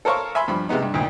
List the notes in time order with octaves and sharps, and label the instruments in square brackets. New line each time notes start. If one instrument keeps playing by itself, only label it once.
[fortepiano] A4 A#4 C5 C#5 F5 C#6
E5 G#5 B5 C6
G2 F3 B5
C3 G#3 B3 D#4
G2
D2 A#2 D#3